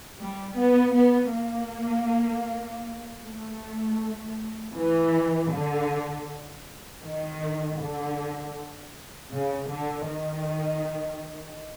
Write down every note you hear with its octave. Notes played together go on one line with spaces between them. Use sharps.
G3
B3
B3
A#3
A3
E3
D3
D#3
D3
C#3
D3
D#3